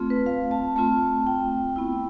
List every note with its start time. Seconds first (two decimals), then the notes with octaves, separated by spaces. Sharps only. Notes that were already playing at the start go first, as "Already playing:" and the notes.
Already playing: A3 C4 F4
0.10 B4
0.26 F5
0.51 A5
0.76 A3 C4 F4 A5
1.27 G5
1.76 B3 E4